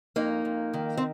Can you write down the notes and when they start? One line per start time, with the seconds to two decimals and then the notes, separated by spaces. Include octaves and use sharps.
0.16 F2 A#3 D#4
0.45 F2
0.74 D#3
0.97 C4